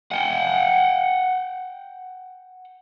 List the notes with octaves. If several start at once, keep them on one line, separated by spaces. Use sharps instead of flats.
F#5 G5